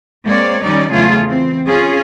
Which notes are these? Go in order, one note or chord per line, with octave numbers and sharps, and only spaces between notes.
G#3 A#3 C4 C#5 D5
D#3 G3 C#4 D#4 D5
E2 C#3 F#3 A3 F4 G#4
E3 C4
C#4 F4 G#4